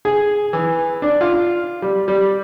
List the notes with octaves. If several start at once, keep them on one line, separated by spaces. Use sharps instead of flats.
G#4
E3
D4
F4
G3
G3